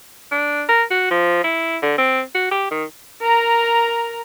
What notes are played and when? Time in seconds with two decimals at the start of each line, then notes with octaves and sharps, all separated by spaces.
0.31 D4
0.69 A#4
0.91 F#4
1.11 F3
1.44 E4
1.83 D3
1.98 C4
2.35 F#4
2.51 G4
2.71 D#3
3.21 A#4 A#5